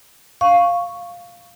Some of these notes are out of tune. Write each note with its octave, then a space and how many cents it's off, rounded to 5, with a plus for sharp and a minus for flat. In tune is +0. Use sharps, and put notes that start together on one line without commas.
F5 +0 C#6 +0